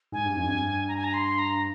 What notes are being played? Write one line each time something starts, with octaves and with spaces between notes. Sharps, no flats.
G#2 G#5
G2
F2
G2
A#5
G#5
A#5
C6
A#5